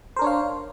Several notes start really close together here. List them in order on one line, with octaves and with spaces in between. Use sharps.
C5 A#4 D4 C#5 F5